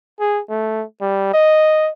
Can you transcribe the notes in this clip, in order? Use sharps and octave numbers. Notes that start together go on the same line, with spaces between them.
G#4
A3
G3
D#5